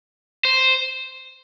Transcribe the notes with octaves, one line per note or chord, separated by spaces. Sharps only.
C5